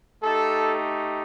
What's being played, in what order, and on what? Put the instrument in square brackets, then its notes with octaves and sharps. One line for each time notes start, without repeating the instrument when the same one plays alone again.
[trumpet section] A3 D#4 G4 A4